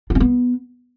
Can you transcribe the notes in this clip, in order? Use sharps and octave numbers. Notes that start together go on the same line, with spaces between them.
F4
C#4
B3